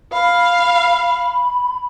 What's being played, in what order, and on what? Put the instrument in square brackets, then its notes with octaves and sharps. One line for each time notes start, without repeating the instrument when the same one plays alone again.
[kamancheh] F5 [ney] B5